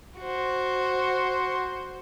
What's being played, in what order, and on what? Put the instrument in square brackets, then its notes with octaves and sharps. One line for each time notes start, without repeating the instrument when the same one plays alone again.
[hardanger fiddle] F#4 C5